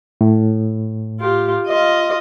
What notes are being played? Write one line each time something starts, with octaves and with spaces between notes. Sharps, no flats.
A2
F4 G4
F4 D#5